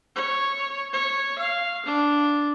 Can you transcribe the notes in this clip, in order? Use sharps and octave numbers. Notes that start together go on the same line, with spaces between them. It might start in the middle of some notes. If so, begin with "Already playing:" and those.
C#5
C#5
F5
D4